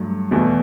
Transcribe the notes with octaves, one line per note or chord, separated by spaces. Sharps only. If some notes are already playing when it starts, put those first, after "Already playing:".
Already playing: G2 F#3 A3
E2 B2 A3